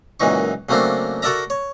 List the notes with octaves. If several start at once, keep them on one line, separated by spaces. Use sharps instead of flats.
C#2 F#2 A#2 E3 D#4 C#6
C#3 F#3 A3 A#3 C4 D4
F#4 A4 A#4 D5 E5 A#5
C#5